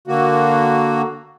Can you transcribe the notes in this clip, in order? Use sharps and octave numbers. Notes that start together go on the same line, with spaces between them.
D3 A#3 F#4